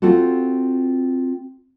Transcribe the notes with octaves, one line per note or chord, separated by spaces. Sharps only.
C4 F4 F#4 A4